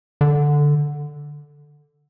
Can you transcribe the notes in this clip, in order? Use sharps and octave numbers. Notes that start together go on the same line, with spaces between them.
D3